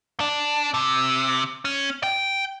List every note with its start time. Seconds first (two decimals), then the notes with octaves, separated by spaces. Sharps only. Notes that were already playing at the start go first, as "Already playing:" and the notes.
0.20 D4
0.74 C3
1.65 C#4
2.03 G5